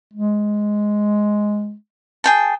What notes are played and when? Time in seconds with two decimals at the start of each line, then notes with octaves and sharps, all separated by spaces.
0.13 G#3
2.24 G#4 G5 A5